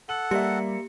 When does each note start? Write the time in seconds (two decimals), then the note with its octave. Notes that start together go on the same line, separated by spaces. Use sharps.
0.09 A4 F#5 F#7
0.31 G3 A#3 G4 D5 E5 C#7